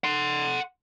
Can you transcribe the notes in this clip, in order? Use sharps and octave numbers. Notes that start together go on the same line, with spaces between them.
F#5 C6